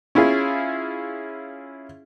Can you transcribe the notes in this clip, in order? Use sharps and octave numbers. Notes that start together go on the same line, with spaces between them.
C#4 E4 F4 G#4